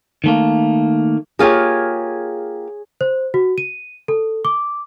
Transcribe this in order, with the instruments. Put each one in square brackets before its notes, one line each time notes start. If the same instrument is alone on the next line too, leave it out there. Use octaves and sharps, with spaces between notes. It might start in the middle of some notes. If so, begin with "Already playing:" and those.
[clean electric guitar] D#3 A3 A#3
[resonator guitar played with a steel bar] A#3 F4 G4 [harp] G#4 C#5 G#5
[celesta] C5
F#4
D#7
A4
D6